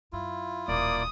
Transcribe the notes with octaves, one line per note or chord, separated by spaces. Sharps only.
F#2 E4 F4
D#1 B1 A#3 D5 D#6